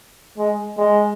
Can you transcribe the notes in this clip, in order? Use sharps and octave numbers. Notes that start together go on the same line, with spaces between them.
G#3
G#3